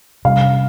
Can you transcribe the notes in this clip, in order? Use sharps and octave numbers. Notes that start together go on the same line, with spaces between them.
C3 G3 C#4 F5